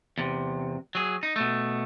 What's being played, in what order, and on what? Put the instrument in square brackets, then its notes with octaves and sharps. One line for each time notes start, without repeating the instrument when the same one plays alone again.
[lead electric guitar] E2 C3
F#3 G#4
D#4
B2 A3